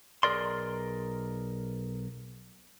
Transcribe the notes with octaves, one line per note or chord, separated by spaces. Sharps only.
B1 G#4 A#4 D5 C6